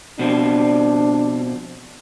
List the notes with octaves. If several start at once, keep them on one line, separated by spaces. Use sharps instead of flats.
B2 F3 C4 D4